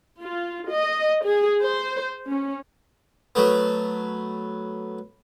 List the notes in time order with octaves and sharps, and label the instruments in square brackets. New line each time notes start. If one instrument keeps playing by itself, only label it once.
[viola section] F4
D#5
G#4
C5
C#4
[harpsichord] F#3 A3 B3